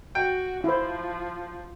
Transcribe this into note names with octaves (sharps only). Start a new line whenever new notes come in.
F#4 G5
F3 E4 C5